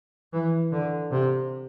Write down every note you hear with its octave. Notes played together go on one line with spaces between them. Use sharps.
E3
D3
C3